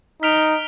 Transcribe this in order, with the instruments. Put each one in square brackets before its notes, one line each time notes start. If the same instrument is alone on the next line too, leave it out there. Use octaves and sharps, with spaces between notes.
[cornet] D#4 [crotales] F6 B6 D7 F7